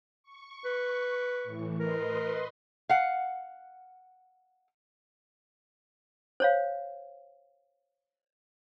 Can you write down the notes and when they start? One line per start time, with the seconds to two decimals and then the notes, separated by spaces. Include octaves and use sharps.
0.23 C#6
0.65 B4
1.44 A2 E3
1.80 A#4 B4 D#5 C6
2.89 F5 F#5
6.40 C5 C#5 F5